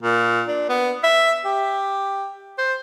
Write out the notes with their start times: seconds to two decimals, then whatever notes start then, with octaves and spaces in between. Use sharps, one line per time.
0.03 A#2
0.48 D4
0.69 B3
1.04 E5
1.45 G4
2.58 C5